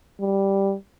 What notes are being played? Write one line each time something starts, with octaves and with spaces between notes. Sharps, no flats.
G3